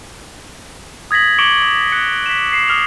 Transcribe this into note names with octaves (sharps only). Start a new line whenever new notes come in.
D#6 G#6 A#6 B6 F#7
C#6 D6 C#7 D7 F#7 G7
F#6 C#7
B6 E7
C7 E7
D#6 F6 F7